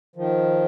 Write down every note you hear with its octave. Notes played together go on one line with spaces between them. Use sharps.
D#3 F3